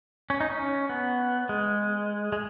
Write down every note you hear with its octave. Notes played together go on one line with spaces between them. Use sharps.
C#4
D#4
C#4
B3
G#3
G#3